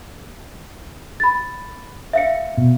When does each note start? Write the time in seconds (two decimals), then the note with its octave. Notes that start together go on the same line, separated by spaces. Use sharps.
1.20 B5 A6
2.13 E5 F5 C#7
2.57 B2